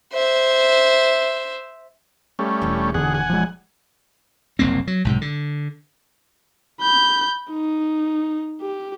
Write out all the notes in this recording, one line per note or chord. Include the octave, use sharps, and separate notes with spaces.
C5 E5
G3 A3 C#4
E1 E3
E2 D3 G#4 F#5
F#5 G#5
F3 G#3
F#1 C2 A#3 C4
F#3
B1 G#2 C3
D3
B5 G6
D#4
G4